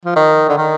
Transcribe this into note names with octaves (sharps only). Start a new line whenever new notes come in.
F3
D#3
D3
D#3